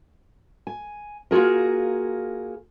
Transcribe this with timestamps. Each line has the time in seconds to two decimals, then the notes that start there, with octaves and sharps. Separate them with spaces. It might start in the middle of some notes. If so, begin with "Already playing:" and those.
0.67 G#5
1.31 A#3 F4 F#4 G#4 A#4